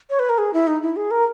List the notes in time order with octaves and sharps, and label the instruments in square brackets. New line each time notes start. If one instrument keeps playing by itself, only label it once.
[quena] C#5
B4
A#4
G#4
E4
D#4
E4
G#4
A#4